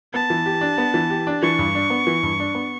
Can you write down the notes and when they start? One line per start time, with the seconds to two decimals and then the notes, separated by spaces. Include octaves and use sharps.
0.13 B3 A5
0.30 E3
0.46 G4
0.61 D4
0.78 B3
0.94 E3
1.10 G4
1.27 D4
1.42 E3 C#6
1.59 G2
1.75 D4
1.90 B3
2.07 E3
2.23 G2
2.40 D4
2.55 B3